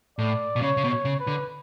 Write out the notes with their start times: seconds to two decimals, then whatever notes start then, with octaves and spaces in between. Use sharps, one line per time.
0.18 A2 D5
0.56 B2
0.62 C#3 C#5
0.77 C#3
0.84 B2
0.90 C#5
1.05 C#3
1.20 B4
1.27 D3